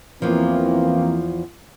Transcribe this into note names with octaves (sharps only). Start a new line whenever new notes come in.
E2 E3 F3 A#3 C4